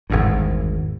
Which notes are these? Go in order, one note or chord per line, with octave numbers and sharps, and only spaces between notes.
G#1 E2 G2